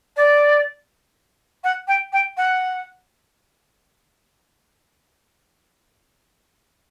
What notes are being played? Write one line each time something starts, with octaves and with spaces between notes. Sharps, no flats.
D5
F#5
G5
G5
F#5